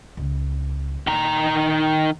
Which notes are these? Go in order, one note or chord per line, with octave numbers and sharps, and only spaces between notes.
C#2
A#2 D#3 A#5